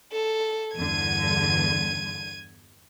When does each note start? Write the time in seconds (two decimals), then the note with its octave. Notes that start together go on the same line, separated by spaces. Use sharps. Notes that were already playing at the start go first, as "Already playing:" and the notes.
0.12 A4
0.76 E2 G2 D3 G#6 D#7